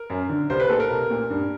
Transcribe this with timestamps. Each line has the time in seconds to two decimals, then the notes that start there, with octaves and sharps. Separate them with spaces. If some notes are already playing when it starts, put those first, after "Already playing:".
Already playing: A#4
0.10 F#2
0.29 D3
0.50 C2 C5
0.60 B4
0.70 A#2 A4
0.80 A#4
0.90 C2
1.10 A#2
1.30 G2